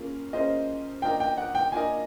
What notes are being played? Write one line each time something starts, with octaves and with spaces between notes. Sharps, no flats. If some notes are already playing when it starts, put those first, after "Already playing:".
Already playing: A#3 C#4 F4 G#4
A#3 C#4 F4 G#4 C5 D#5
A#3 D4 F4 A#4 D#5 G5
G5
F#5
G5
A#3 D4 F4 A#4 D#5 G#5